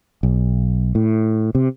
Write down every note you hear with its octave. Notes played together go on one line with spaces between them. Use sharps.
B1
A2
C3